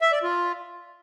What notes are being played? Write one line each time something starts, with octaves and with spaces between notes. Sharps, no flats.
E5
D5
F4